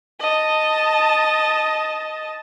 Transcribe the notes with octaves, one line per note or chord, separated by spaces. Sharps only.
D#5 A5